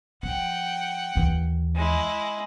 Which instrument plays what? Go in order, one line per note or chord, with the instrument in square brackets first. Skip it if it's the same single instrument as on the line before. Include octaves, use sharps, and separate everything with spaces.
[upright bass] F3 [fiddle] F#5 G5
[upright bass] D#2 E3
[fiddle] G#3 E4